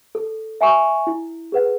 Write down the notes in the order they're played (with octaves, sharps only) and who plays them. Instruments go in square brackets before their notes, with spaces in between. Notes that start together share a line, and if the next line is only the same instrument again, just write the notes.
[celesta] A4
E5 G#5 C#6
E4
G#4 B4 F#5